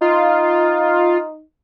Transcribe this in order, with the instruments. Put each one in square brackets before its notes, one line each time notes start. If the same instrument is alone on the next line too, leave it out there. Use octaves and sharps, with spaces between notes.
[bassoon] D#4 [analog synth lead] F4